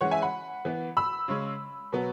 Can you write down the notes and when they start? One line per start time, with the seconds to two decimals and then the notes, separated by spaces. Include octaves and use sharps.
0.01 E3 G#3 C#4 C#5 F#5
0.11 E5 G#5
0.22 F#5 B5
0.65 E3 B3
0.97 B5 E6
1.28 C#3 G#3 C#4
1.92 B2 F#3 B3